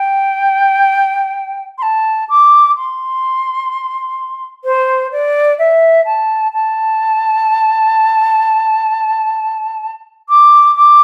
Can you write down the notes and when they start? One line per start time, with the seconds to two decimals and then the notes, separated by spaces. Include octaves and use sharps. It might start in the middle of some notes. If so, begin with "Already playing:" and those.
Already playing: G5
1.78 C6
1.82 A5
2.29 D6
2.77 C6
4.64 C5
5.11 D5
5.58 E5
6.05 A5
6.53 A5
10.29 D6
10.75 D6